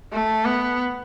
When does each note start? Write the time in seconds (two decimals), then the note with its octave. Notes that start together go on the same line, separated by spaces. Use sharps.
0.12 A3
0.45 B3